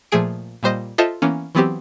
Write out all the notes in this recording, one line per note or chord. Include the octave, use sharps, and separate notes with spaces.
A#2 F3 A3 G#4 D7
A#2 G3 C5 D#5
F4 A4 C5 D#5 E5 A5
E3 A#3 B3 C#4
E3 F#3 B3 C4 G4